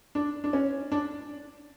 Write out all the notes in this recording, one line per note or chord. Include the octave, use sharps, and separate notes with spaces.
D4
D4
C#4
D4